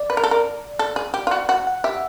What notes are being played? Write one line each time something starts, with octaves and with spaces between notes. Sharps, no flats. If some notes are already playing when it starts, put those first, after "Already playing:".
Already playing: D5
B4
A#4
A4
A#4
A4
G#4
G4
F4
F#4
F#4 F#5
F#5
G4 E5